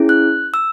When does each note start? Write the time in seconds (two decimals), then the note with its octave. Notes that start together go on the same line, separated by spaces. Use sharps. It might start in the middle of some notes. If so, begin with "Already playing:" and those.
Already playing: C#4 E4 G#4
0.09 F#6
0.54 E6